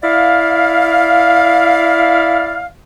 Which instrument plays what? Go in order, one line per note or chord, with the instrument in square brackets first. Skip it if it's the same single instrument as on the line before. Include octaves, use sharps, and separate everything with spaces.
[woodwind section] E4 D5 F5